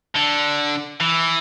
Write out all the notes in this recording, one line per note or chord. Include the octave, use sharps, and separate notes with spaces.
D3
E3